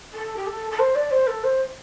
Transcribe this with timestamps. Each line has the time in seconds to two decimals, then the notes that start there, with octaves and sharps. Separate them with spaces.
0.14 A4
0.37 G4
0.47 A4
0.71 A4
0.79 C5
0.95 D5
1.11 C5
1.27 A4
1.44 C5